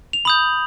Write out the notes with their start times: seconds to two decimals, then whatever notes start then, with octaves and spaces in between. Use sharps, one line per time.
0.13 F7
0.25 B5 D#6 G6 F#7